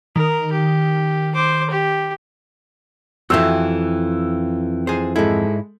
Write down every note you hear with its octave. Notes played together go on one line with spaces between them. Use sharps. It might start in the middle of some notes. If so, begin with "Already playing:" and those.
D#3 A#4
G4
C5 D6
G4
F2 E3 F#4 C5 E5 G5 E6
G#4 C5
G#2 G#3 E4 A4